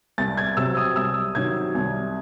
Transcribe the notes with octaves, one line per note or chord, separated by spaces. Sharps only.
C2 A6
G#6
C3 F#3 C4 E6
D#6
C2 E6
C3 D#3 F#3 G#6
C2